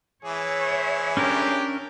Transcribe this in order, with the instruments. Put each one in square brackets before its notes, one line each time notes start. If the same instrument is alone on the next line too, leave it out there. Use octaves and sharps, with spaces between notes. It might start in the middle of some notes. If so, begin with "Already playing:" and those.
[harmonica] E3 G#4 [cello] C#5 E5
[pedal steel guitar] C#4 D4 A#4 [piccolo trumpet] G4